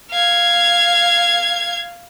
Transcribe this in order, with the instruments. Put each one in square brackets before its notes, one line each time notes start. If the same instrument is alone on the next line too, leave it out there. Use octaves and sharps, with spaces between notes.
[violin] F5 G#6